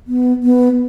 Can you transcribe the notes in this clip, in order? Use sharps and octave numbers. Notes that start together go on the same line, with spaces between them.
B3
B3